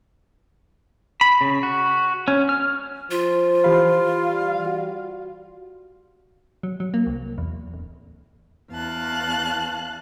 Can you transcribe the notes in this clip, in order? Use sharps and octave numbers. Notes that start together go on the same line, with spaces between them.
B5
C#3
F#4
C#4
F6
F3 F4
E3 G4 F5 B5
G3
F#4
F#3
F#3
A#3
C2
E2
D1
E2 F5 A5 F#6